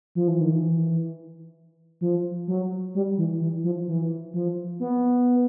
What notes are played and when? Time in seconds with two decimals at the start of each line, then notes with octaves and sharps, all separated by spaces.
0.15 F3
0.28 E3
0.40 D#3
0.51 E3
2.01 F3
2.48 F#3
2.95 G3
3.18 E3
3.41 E3
3.64 F3
3.88 E3
4.34 F3
4.80 B3